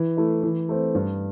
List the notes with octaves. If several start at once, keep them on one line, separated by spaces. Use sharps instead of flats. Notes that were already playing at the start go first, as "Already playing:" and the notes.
Already playing: E3
A3 E4
E3
A3 C4
G2